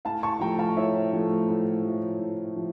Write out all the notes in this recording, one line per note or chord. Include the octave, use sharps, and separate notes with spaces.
A2 F5 A5
A5 C#6
F3 A3 G5 A#5
F5 A5
A2 C#5 E5
F3 A3
A2
F3 A3
A2
F3